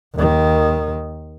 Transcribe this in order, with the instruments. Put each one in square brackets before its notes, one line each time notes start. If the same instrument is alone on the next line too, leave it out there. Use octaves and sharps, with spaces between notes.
[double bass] D#2 D#3